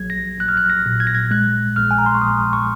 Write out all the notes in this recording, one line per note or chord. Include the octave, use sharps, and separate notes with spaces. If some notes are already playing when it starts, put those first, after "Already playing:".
Already playing: A#1 F#3 G#6
A#6
A#1 F#6
F6
F#6
A#6
A#2
G#6
A#6
G#6
G#3 F#6
A#1 F6
G#5
A#5
C6
C#6
A#1 D#6
C#6